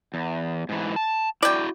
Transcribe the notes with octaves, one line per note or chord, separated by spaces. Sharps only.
E2
G#2 E3
A5
E4 F#4 D5 G5